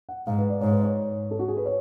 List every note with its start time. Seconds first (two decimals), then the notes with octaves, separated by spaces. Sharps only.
0.09 F#5
0.27 G#2 F5
0.38 B4
0.49 D5
0.61 G#2 C#5
0.71 B4
0.83 C#5
1.31 A4
1.39 F#4
1.48 G#4
1.57 B4
1.66 C#5